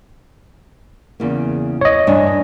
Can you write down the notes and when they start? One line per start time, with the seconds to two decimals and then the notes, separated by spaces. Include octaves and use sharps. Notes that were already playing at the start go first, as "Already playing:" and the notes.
1.20 E2 C#3 A#3
1.81 C#5 D#5
2.07 G2 D4 G#5